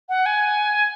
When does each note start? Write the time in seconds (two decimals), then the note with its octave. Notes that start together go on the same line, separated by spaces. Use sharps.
0.09 F#5
0.26 G#5